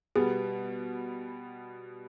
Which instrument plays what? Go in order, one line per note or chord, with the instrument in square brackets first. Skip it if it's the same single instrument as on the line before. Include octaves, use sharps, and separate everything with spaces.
[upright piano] B2 G3 B3 [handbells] G#4